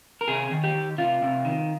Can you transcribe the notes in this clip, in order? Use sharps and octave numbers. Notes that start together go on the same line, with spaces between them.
A#4
C3 G#4
D#3
G4
D#3
C3 F4
C3
D#3